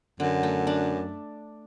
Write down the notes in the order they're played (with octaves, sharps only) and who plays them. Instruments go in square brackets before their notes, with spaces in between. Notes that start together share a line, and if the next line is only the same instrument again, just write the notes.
[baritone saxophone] F#2 [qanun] D3
[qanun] A3
D4